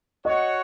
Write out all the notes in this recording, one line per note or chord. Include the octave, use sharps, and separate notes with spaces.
F#4 C#5 D#5 F#5